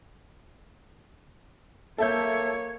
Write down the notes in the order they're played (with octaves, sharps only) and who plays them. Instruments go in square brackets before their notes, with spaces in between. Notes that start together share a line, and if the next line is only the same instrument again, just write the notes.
[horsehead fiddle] A#3 C#5 [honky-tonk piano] A4 E5 G6